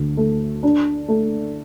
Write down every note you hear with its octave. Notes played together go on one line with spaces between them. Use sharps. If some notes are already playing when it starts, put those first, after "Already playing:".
Already playing: D2
A3
D4
A3